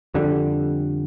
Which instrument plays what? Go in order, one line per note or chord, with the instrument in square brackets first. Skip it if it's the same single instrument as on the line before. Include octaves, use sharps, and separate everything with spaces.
[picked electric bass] F2 D3 G3